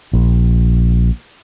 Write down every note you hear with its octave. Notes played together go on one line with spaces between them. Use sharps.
A#1